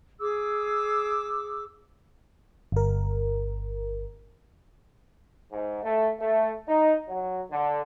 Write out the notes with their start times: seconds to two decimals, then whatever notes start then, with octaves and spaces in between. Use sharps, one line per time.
0.20 G#4 D6 E6
2.72 G1 A#4
5.52 G#2
5.83 A3
6.20 A3
6.69 D#4
7.09 F#3
7.51 D3